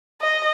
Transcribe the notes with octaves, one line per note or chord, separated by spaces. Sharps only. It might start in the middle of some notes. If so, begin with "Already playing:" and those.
D#5